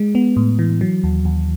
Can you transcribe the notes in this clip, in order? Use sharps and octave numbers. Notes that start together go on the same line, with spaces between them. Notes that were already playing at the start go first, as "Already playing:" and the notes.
Already playing: G#3
B3
A2
E3
F#3
D#2
D#2